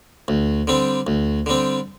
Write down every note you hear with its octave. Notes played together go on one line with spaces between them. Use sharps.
D2
D3 G3 C4
D2
D3 G3 C4